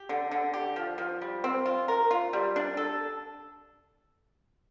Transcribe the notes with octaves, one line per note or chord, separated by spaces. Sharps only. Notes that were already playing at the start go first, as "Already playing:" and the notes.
Already playing: G4
D3
D3
G4
F3
F3
G3
C4
F4
A#4
F4
G3
D4
A4